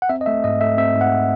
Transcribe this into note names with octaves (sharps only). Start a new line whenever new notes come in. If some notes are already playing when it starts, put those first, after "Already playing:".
F#5
C4 E5
D#5
A3 E5
G#2 D#5
A3 E5
C4 E5
G#2
F#5